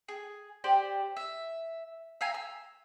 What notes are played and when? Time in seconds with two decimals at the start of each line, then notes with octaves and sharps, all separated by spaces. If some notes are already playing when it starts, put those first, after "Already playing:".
0.08 G#4
0.64 G4 C5 D5
1.17 E5
2.21 E5 F5 G#5 A#5
2.34 E6